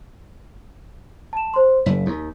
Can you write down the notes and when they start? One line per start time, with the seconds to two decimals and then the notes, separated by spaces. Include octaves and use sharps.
1.33 A5 E7
1.54 C5 C6
1.86 F#1 B6
2.06 D#2